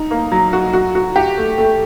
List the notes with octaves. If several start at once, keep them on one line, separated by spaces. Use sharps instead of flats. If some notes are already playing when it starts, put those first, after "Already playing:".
Already playing: D#4
A#3
F#3
F#4
F#4
F#4
G4
A3
A3